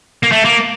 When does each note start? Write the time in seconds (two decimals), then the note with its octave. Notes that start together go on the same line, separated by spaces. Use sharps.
0.23 A#3
0.32 A3
0.45 A#3